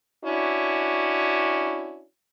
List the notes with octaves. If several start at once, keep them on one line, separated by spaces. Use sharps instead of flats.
C#4 D4 E4 F#4